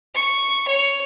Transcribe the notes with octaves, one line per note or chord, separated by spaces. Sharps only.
C#6
C#5